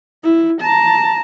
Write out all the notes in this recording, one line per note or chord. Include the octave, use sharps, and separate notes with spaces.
E4
A5 A#5